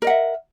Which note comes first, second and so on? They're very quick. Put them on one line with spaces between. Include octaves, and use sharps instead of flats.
A#4 D#5 F#5 E5